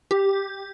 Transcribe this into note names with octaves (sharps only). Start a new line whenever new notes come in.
G4